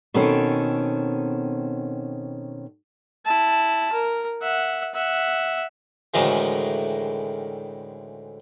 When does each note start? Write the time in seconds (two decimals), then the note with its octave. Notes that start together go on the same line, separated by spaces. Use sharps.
0.14 B2 D#3 C4 C#4 A4
3.25 E4 A5
3.92 A#4
4.42 E5 F#5
4.94 E5 F#5
6.14 D2 A2 D#3 E3 G#3